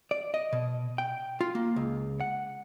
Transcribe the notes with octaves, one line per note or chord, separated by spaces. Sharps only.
D5
D#5
B2
G5
F4
A#3
C#2
F#5